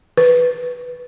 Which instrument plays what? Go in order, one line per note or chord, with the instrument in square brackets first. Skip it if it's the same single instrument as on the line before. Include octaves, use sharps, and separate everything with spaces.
[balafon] B4